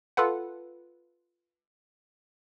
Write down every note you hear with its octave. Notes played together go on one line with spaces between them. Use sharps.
F4 A4 B4 F#5